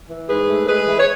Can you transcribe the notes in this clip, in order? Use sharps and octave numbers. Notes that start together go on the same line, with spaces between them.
E3
G#2 G#4 B4
A3
G#3 G#4 B4
E3
C#5